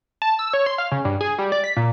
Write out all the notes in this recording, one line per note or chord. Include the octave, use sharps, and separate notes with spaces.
A5
E6
C#5
C6
F5
C#3
G2
G#4
G3
D5
B6
A#2